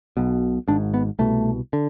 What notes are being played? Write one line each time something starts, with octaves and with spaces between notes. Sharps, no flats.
B1 B2
G#1 G#2 D4
B3
C2 B2 A3
D3